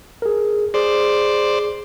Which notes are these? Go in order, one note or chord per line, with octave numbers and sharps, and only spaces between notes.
G#4 A#4
G#4 C5 D5